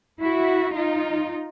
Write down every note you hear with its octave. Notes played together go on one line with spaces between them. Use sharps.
E4 F#4
D#4 F4